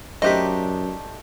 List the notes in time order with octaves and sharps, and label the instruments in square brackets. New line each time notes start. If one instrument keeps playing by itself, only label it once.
[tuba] F#2 [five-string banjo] A3 D4 D#4 [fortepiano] G4 C5 [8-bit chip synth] D#5 B6